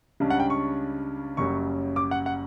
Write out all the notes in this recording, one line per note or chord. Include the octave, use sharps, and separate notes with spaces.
C#2 C#3 G3 D4
F#5
G5
C#6
F#1 F#2 C#3 G3 C#6
D6
F#5
F#5